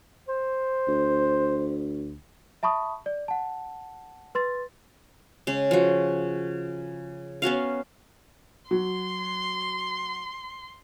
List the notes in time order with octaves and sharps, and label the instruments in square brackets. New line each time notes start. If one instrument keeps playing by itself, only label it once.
[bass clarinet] C5
[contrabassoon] D2
[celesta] E5 A5 B5 C#6 D#6
D5
F#5 A5
B4 C6 A6
[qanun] C#3 G#3
F3 F#4
B3 C#4 F#4 F5
[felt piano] F#3 [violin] C6